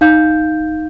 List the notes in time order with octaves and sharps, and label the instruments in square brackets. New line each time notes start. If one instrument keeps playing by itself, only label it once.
[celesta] D#4 F5 G6